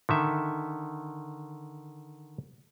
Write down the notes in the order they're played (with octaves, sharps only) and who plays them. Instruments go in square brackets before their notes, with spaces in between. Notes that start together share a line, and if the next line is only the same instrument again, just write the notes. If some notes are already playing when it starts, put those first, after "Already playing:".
[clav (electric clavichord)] D3 D#3 E5